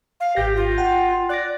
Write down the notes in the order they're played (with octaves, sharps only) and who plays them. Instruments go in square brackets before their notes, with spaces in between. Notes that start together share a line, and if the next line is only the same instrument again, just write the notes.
[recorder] F5
[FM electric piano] G#1 G6 A#6 [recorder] G4
[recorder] F4
[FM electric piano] F#5 G5
[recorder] D5 [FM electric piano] F#6 A#6